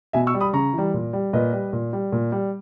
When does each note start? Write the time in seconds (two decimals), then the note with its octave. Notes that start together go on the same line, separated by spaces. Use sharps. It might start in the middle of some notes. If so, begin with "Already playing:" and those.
0.13 B2 E5 G#5
0.27 C#6 E6
0.34 G3
0.40 B5 D#6
0.53 C#3 A#5 C#6
0.73 E3 G3
0.94 A#2
1.13 G3
1.33 A#2 B4 D#5
1.53 G3
1.73 A#2
1.93 G3
2.12 A#2
2.32 G3